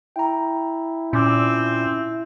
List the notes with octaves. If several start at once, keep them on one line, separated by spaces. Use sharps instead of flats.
E4 G5 A#5
A#2 C4 C#4 D6 E6